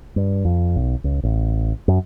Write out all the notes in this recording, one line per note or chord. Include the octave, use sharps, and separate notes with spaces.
G2
F2
B1
C#2
A1
F#2